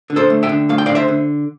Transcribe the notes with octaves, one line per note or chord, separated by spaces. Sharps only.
D3
A4 C5
A3
E5 G5
D3
A3 F5
G5
D3 D5 F5
C5 E5
D3